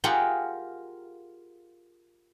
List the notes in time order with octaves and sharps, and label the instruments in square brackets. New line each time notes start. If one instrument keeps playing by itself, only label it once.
[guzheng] F4 G4 G#4 A#4 F#5 A#5